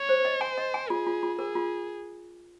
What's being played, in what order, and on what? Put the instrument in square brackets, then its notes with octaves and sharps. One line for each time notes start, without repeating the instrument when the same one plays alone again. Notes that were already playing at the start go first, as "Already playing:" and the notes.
Already playing: [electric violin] C#5
[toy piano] C5
D#5
[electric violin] C5 [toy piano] G#5
[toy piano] D#5
G#5
[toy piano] F4 [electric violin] G#4
[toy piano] F4
F4
[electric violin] G#4 [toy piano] A#4
[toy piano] F4